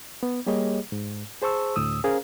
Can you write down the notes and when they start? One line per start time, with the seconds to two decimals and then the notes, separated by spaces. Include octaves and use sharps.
0.23 B3
0.47 G3 A#3 G4 G#4 C#5 D#5
0.92 G#2
1.42 G#4 C5 A5 C#6 E6
1.76 D2 A2 D#6 E6
2.04 C#4 G#4 A#4 C5 F5 A#5